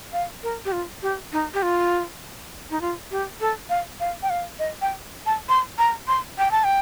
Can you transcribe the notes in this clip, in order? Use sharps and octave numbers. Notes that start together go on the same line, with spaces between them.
F5
A#4
G4
F4
G4
D#4
G4
F4
D#4
F4
G4
A4
F5
F5
G5
F5
D#5
G5
A5
C6
A#5
C6
G5
A5
G5